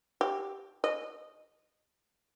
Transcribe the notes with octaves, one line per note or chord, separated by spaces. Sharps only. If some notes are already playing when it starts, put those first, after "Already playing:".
G4
D#5